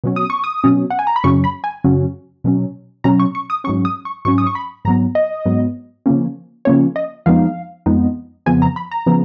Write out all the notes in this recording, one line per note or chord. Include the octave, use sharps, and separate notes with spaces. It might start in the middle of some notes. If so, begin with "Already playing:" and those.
B2 F#3 C#4
D#6
C#6
D#6
B2 F#3 C#4
F#5
G#5
A#5
B5
F#2 C#3 F#3 C#4 C#6
B5
G#5
F#2 C#3 F#3 C#4
B2 F#3 C#4
B2 F#3 C#4 A#5
C#6
C#6
D#6
G#2 F#3 C#4 C#6
D#6
C#6
G#2 F#3 C#4 C#6
D#6
C#6
B5
G#2 F#3 B3 A#5
D#5
G#2 F#3 B3
C#3 F3 A#3 C#4
C#3 F3 A#3 C#4 C#5
D#5
F2 F3 G#3 B3 D#4 F5
F2 F3 G#3 B3 D#4
F2 C#3 F3 B3 G#5
A#5
B5
A#5
C#3 F3 B3